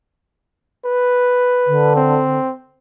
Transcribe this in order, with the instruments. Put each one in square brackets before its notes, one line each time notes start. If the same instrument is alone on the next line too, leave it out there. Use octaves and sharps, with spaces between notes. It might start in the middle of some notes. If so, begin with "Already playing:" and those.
[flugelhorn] B4
[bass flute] D3
[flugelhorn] C4